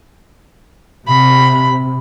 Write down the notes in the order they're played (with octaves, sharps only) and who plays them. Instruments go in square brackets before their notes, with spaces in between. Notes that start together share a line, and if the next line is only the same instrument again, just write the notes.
[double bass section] C3 [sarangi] B5